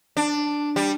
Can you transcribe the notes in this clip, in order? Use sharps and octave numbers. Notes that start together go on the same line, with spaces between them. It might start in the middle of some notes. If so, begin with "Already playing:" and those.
D4
G3